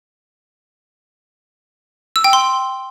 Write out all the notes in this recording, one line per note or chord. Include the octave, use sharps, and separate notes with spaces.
E6
G5
C6